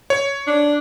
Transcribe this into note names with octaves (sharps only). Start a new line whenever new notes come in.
C#5
D4